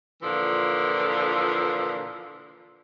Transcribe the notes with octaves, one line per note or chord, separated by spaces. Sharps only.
A#2 D3 E3 F3